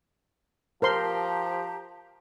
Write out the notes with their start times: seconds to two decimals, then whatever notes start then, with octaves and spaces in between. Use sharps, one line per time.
0.82 F3 G4 A#4 C5 A5 A#5 C6